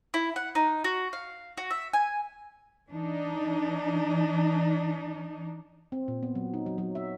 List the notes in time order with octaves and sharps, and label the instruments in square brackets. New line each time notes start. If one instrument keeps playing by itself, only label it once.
[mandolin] E4
F#5
D#4
F#4
F5
F#4
E5
G#5
[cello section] E3 D4 D#4
[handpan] C4
A#2
B3
F#3
D#4
F#3
F#3
E5